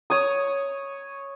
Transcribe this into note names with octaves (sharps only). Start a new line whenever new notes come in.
C#5 D#6